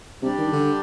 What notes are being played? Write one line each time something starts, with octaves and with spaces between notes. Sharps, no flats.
C3 G3 D4 G4 D5
D#3
D3